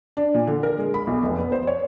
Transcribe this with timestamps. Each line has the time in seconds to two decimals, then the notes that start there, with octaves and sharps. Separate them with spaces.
0.17 D4
0.34 A#2
0.47 D3
0.63 A#4
0.79 G#3
0.94 B5
1.07 B1
1.23 F1
1.39 B3
1.52 C5
1.67 C#5